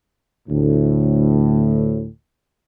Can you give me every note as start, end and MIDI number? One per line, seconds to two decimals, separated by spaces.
0.49 2.05 38
0.49 2.05 45